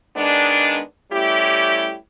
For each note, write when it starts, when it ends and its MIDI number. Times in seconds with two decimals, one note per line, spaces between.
0.17 0.80 51
0.17 0.80 56
0.17 0.80 59
0.17 0.80 62
1.12 1.96 55
1.12 1.96 57
1.12 1.96 61
1.12 1.96 64
1.12 1.96 67